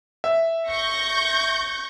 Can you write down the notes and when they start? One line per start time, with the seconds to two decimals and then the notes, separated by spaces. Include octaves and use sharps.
0.24 E5
0.69 G1 C#6 G6 A#6